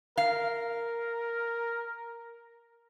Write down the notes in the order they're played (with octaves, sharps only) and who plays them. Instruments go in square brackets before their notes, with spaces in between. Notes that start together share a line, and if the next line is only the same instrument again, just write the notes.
[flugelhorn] A#4 [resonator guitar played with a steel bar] F5